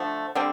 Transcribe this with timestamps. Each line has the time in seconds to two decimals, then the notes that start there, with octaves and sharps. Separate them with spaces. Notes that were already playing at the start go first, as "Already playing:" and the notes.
Already playing: D3 F3 A3
0.35 D3 G3 C4